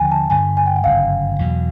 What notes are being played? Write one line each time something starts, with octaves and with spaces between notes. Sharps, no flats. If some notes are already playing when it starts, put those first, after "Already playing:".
Already playing: D#2 D3 F3 G5 G#5
A5
G2 D3 G3 G#5
G#5
G5
F#5
G1 F#2 C#3 F5
E2 B2 F#3